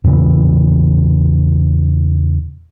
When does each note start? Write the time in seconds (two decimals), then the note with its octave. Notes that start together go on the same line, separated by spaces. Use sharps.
0.04 E2 A#2 C#3 E3